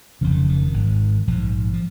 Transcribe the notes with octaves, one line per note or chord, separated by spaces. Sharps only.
F1 F2 C#3 F3
D#3
D#3
G#1 G#2
A#1 G#2 F3
F3